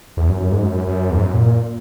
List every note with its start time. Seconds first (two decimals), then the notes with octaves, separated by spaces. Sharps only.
0.17 E2
0.29 F#2
0.40 F#2
0.52 G#2
0.63 F#2
0.87 F#2
1.10 E2
1.17 G#2
1.22 F#2
1.34 A#2
1.46 A#2